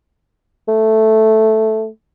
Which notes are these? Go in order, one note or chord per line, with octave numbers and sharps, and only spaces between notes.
A3